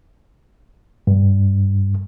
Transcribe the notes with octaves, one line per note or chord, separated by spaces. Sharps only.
G2